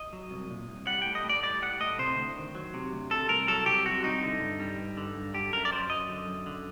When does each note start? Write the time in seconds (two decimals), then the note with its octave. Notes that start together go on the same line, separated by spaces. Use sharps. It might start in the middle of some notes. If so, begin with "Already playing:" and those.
Already playing: D#5
0.13 F#3
0.31 C2
0.50 A#2
0.69 C2
0.87 G3 F#5
1.02 A2 G5
1.15 D#5
1.24 A2
1.29 D5
1.43 G3 D5
1.62 G3 F#5
1.80 A2 D#5
1.99 C3 C5
2.17 D2
2.36 D#3
2.55 F#3
2.74 C3
2.92 D2
3.11 C3 A4
3.29 C2 A#4
3.48 F#3 A4
3.66 C2 G4
3.85 C3 F#4
4.03 C2 D#4
4.23 D3
4.41 G2
4.60 G3
4.78 G2
4.97 D3
5.16 G2
5.34 D3 G4
5.53 F#2 A#4
5.65 D5
5.72 F#3 C5
5.90 F#2 D#5
6.09 D3
6.28 F#2
6.46 D3